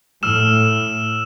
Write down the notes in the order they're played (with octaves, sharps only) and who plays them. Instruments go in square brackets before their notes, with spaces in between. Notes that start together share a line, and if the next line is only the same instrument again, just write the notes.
[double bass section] A2 [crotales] E6 F6 E7